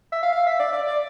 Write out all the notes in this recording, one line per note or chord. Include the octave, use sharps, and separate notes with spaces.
E5
F5
F5
E5
D5
D5
D5